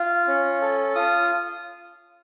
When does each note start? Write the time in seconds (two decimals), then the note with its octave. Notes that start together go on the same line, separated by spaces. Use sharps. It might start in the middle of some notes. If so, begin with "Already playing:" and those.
Already playing: F4
0.28 C#4
0.62 A4
0.95 F4 D#6